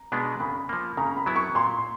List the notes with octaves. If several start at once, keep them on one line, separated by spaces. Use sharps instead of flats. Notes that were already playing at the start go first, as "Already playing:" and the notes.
Already playing: A#5
B2 G#3 B3 D4
C#3 B5
F3 A#3
C#3 A#5
B5
F#3 B3 E4
C#6
A#2 C6